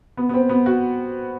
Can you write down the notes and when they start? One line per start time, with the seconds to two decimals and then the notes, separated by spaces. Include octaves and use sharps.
0.17 B3
0.29 B3
0.34 C4
0.49 B3
0.66 F#4